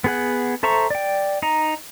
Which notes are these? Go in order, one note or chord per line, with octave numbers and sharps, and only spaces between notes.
B3 G#4 F#5
A4 C5 E5 A#5 C#6
D5 G5
D#4 A#5